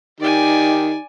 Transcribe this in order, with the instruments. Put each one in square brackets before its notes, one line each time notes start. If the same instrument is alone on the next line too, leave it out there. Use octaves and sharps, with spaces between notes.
[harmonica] D#3 G4 [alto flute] D#4 [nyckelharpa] D5 G#5